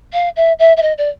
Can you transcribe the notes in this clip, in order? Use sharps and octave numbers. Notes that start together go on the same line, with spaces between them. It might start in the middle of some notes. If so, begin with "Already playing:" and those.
F5
E5
E5
E5
D#5
D5